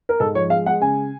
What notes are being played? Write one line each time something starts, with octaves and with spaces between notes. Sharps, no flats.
A#4
G#2 A4
F3 C#5
G#3 F5
G#3 F#5
C#3 G#5